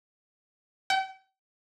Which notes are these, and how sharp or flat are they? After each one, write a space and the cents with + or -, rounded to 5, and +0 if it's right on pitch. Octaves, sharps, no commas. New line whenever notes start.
G5 -40